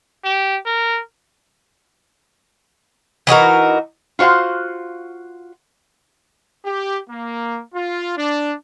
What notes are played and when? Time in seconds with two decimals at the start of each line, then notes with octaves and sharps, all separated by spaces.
0.24 G4
0.66 A#4
3.27 E3 D#4 F#4 A#4
4.19 F4 F#4 C5 F5 F#5
6.65 G4
7.10 A#3
7.75 F4
8.17 D4